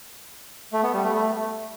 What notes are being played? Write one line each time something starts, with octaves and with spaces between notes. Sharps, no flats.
A3
B3
G3
A3
A3